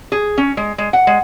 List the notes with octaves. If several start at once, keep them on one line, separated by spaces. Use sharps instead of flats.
G#4
C#4
G#3
G#3
F#5
G#3